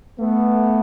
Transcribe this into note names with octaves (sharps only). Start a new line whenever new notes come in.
A3 B3